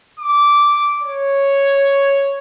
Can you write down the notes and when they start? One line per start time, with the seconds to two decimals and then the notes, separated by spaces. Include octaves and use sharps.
0.20 D6
1.03 C#5